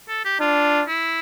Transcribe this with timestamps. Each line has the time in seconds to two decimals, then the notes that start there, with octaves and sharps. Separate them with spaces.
0.09 A4
0.25 G4
0.40 D4 F4
0.87 E4